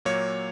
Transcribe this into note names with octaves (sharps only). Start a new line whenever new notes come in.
A#2 F#3 A#3 C#5